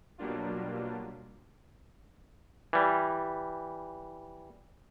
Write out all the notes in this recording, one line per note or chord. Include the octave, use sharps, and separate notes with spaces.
B2 F#3 G3 A#3 D4 F4
E3 G3